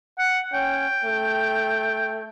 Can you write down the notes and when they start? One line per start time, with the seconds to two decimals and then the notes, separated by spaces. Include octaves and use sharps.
0.19 F#5
0.53 C#4 G5
1.05 A3